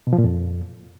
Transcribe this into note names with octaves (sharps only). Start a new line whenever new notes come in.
B2
F3
A#2
F2